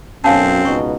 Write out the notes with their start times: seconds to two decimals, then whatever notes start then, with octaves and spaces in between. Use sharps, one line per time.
0.24 B1 F#2 C4 C#4 F5 G#5 A5
0.65 C#2 B2 D#4 C#6